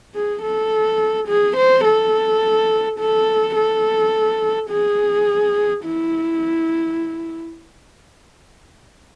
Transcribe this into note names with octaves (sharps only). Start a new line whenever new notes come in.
G#4
A4
G#4
C5
A4
A4
A4
G#4
E4